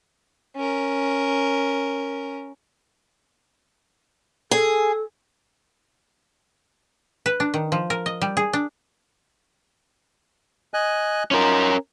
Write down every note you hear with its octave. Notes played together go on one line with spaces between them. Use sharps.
C#4 A#4
G#4 A4
B4
D4
D#3
F3
A#4
D#5
G3
G#4
D4
D#5 G#5 F#6
C#4 D#4 F4 A#4